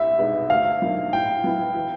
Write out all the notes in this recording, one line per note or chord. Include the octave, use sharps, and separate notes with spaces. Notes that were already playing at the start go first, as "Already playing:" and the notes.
Already playing: C2 E5
B2 G#3 B3 D#4
D2 F5
D3 F#3 A#3 D#4
A2 G5
F#3 B3 E4
E3